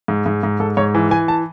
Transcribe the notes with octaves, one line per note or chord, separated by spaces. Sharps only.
G#2
G#2
G#2
G#2 A4
G#2 C#5
E3 G#5
E3 G#5
A5